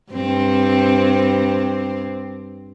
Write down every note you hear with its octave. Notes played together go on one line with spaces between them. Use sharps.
G2 C4